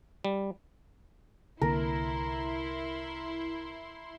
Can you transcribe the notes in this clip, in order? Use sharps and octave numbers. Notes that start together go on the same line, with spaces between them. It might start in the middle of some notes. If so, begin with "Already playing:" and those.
G3
C2 D3 A#3 E4 A#4 C6